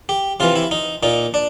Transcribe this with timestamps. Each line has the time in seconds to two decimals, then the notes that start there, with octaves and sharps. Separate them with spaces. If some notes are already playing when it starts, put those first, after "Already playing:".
0.09 G4
0.40 C3 E3 F4
0.56 E4
0.71 D#4
1.03 A#2 D#4
1.34 D4